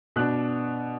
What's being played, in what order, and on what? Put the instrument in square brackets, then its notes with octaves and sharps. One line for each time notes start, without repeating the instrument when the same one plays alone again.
[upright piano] B2 B3 D4 F#6